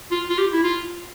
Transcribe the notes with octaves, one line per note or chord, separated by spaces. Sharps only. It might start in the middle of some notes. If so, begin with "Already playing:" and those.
F4
F4
G4
E4
F4